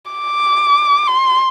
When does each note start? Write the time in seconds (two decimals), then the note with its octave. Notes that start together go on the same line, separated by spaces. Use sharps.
0.11 D6
1.07 C6